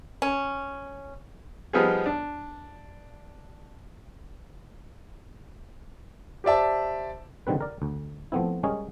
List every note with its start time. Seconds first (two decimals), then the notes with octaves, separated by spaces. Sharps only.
0.22 C#4
1.73 F3 G3 B3 D#4 F4 G#4
2.06 D4
6.44 G4 C5 D5 E5 A5
7.47 D3 D#3 G3 C4 B4
7.61 A#4 D5
7.82 D2
8.32 F3 A3 B3 C4 E4
8.63 G3 G#3 C#4 A#4 C#5 D#5